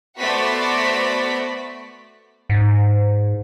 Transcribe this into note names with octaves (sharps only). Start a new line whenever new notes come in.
A3 B3 F#4 C5 D5 B6
G#2